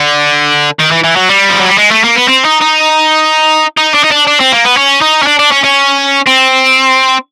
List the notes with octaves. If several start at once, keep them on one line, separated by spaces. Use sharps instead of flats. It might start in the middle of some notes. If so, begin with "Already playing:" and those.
Already playing: D3
D#3
E3
E3
F#3
G3
F3
F#3
G3
G#3
A3
A#3
B3
C4
D#4
D#4
D#4
D4
D#4
D4
D4
C4
A#3
B3
C#4
D#4
C#4
D4
D4
C#4
C#4
C4